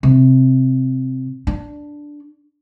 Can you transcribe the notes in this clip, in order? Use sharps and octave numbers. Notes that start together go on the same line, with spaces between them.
C3
D4